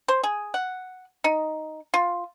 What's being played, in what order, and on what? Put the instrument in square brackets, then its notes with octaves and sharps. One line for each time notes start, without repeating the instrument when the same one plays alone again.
[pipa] C5
G#4
F#5
D#4
F4